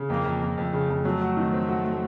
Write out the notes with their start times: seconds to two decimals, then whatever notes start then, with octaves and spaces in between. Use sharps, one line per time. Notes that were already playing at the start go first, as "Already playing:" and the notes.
Already playing: C#3
0.10 F2 A#3
0.25 F2
0.41 F2
0.57 F2 A3
0.73 C#3
0.90 F2
1.05 F#3 A3
1.22 F#4
1.37 D#3
1.52 C4
1.68 F#4
1.85 F#4